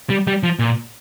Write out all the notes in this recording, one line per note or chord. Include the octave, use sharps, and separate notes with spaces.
G3
G3
F3
A#2